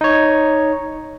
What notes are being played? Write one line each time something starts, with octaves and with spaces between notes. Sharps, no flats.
D#4 C#5